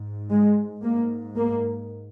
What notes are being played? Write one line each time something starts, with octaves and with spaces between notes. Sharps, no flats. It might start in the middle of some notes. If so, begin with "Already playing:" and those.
Already playing: G#2
G#3
G#2 A#3
A#3